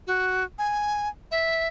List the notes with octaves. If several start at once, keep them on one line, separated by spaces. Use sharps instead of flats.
F#4
G#5
E5